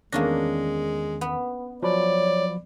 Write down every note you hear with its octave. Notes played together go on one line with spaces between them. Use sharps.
E2 D#3 G#3 A#3 C#4 D4 A#6
B3
F3 F#3 C#5 D5 B5